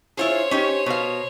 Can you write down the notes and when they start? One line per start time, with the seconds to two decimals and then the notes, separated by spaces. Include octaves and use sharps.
0.17 E4 F4 G#4 C5 C#5
0.51 C#4 D#4 G4
0.86 B2 F5